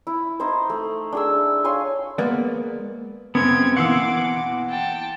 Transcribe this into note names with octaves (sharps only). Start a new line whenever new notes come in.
E4
D#4 E4 C5
A3
D4 G#4 E6
C#5 F5 G#5 C6
G#3 A#3 B3 B4 D5
F#2 C#3 B3 C4 G#6
B2 E3 A#3 F#5 C6 D6 E6
G5 A5